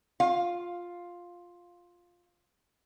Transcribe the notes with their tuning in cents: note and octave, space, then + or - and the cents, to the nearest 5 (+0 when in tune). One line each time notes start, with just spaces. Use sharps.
F4 +5 F5 +0